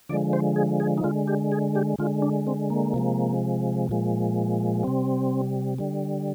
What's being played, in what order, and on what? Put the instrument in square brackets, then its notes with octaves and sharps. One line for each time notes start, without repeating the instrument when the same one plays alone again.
[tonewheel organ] D3 F3 G#3 D5
C5
G#4
G#4
D#4
D3 G#3 F4
G4
G#4
G4
D3 G#3 F4
D4
C4
A#3
C3 F3 G#3
A#2 F3 G#3
C3 G3 C4
D3 G3